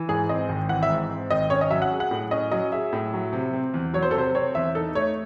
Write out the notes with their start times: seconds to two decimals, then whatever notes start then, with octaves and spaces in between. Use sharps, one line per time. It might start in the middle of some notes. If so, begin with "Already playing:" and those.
Already playing: E3
0.09 G#2 G#4
0.29 C4 D#5
0.49 G#1
0.69 E3 F#5
0.83 E5
0.89 G#2
1.10 C4
1.31 G#1 D#5
1.50 C#4 C#5
1.61 D#5
1.70 F#3 E5
1.82 F#5
1.91 G#4
2.00 F#5
2.11 A2
2.31 C#4 D#5
2.52 F#3 D#5
2.72 G#4 E5
2.93 A2
3.14 F#3
3.33 C3
3.53 C4
3.74 E2
3.94 F#3 C#5
4.02 C5
4.11 A4
4.15 C3 C5
4.35 C4 C#5
4.55 E2 E5
4.75 D#4 A4
4.95 A3 C#5